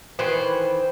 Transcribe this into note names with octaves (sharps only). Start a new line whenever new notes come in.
D#3 E3 B4 C5